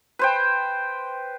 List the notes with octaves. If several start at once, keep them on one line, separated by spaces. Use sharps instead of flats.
B4 C5 G5